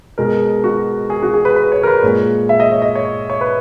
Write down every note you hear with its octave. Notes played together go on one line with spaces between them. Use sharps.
B2 G#3 A#4
F#4
G#4
F#4
G#4
B4
B4
C#5
A#4
B4
A#2 G#3 C#5
E5
D#5
C#5
D#5
C#5
C#5
B4